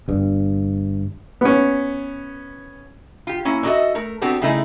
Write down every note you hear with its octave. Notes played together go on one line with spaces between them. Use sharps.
G1 G2
B3 C#4
F4 G4
A#3 C#4 E4
D4 D#4 F#4 A4 D#5 E5
A3 A#4
B3 C4 D4 F#4 G4 A4
C#3 G3 A3 D#4 E4 G#4